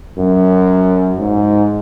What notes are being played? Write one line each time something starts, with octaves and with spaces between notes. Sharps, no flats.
F#2
G#2